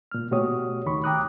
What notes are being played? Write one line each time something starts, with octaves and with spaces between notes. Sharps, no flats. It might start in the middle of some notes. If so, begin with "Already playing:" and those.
A#2 F6
B2 A3 F#4 G4 C#5 D#6
D#2 D#3 B5 C#6
G5 A#5 D6 D#6 F#6